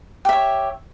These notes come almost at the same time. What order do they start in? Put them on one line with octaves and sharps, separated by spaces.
G4 E5 C#5